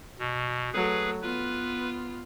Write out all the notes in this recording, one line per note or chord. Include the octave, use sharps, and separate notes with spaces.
B2
F#3 A3 G#4 B4
B3 F4 B4